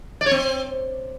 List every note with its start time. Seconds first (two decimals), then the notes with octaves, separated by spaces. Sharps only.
0.21 D5
0.26 C#5
0.31 C4